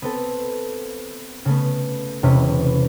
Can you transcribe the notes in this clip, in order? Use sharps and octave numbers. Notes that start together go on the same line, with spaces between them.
B3 C4 A4
C#3 A3 B3
E1 C3 C#4 B4